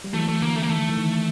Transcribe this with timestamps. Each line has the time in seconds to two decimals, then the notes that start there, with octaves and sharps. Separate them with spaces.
0.04 G3
0.14 E3 F#3 A3
0.28 A3
0.41 D3 E3 A#3
0.56 A3
0.62 A#3
0.69 D#3 A3
0.89 E3
0.97 D#3